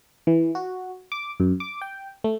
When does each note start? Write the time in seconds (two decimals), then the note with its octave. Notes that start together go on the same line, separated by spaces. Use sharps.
0.27 E3
0.55 F#4
1.12 D6
1.40 F#2
1.60 D6
1.81 G5
2.24 A3